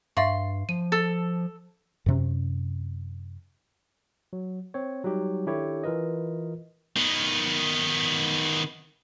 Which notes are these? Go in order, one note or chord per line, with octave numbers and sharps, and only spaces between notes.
G2 E5 F5 C6 C#6
F3 D#7
A4 A6
F#2 C3 C#4
F#3
C4 C#5
F#3 G3 D#4 G4
D#3 D4 E4 G4 A4 C#5
E3 F4 A#4 B4 D#5
D#3 B3